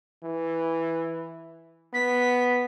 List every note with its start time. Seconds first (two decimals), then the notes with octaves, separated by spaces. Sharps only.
0.25 E3
1.94 B3 B6